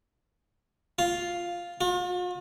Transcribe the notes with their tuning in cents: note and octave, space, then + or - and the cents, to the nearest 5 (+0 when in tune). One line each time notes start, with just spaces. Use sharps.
F4 +0
F4 +45